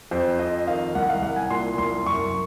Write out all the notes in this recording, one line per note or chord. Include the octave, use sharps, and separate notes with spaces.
F2 C5
F2 D#5
D#3 F5
C2 F#5
F5
C2 F#5
G#5
A#2 C6
C2 C6
F#2 C#6